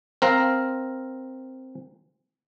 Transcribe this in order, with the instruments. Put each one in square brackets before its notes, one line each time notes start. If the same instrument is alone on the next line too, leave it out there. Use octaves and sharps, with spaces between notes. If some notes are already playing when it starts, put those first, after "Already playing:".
[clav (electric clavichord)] C4 A#4 F5